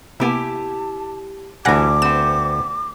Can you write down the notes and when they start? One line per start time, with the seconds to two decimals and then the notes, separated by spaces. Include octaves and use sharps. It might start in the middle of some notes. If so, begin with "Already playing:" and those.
0.20 C3 A#3 B3 E4 G4 G#5 A5
1.65 D2 E3 G3 F#5 G#5 D6 F#6 A#6
2.02 B3 C4 E7